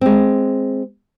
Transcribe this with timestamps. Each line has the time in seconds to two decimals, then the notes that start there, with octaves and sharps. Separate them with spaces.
0.01 G#3 C4